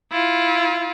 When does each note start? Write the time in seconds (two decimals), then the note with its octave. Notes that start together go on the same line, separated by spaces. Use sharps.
0.11 E4 F4